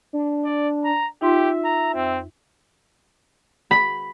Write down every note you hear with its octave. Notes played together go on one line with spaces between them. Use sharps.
D4
D5
A#5
D#4 F4 G4 E5 C6
A#5
F2 C4
B5